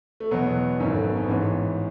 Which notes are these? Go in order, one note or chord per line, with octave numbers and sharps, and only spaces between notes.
A3
E2 B2 F#3 B3
G#1 F#2 D#3 C#4
A3
B3
C#4
B3
A1 G#2 E3 C#4